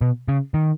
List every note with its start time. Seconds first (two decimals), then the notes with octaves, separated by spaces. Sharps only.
0.01 B2
0.28 C#3
0.54 D#3